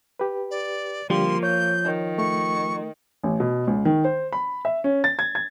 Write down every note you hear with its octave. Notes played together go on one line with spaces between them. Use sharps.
G4 B4
D5
D3 F3 G3 A#3 G4 C6
C#5 G6
D#3
A3 C#6
A1
B2
C#2
D#3
C5
B5
E5
C#4
A6
G#6
G#6